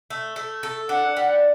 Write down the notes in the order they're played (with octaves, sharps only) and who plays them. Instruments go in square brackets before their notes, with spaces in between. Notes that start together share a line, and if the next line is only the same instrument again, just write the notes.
[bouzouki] A3
A3
A4
[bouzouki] D4 [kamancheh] F#5
[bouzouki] G3